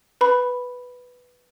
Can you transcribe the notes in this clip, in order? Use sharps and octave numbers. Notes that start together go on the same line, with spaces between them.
B4 B5